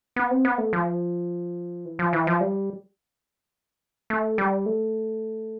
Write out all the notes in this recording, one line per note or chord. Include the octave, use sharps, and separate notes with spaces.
B3
C4
B3
A3
F3
E3
F3
E3
F3
G3
A3
G3
A3